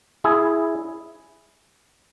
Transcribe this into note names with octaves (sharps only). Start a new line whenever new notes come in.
E4 G#4